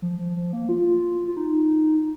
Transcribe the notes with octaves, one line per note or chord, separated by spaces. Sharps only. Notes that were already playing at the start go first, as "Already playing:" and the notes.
F3
F3
F3
A#3
F4
F4
D#4